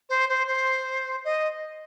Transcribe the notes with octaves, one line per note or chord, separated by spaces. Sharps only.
C5
C5
C5
D#5